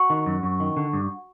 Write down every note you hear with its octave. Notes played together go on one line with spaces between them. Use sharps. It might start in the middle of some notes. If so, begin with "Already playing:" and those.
Already playing: F#4
D#3
F#2
F#2
D#3
D3
G2